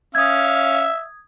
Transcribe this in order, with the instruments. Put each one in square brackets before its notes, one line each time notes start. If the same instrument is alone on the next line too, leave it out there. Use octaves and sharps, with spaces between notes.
[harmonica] C#4 F5 [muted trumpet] E5 [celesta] D#6 G#6